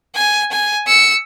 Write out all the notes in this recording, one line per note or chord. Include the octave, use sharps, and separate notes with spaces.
G#5
G#5
E6 C#7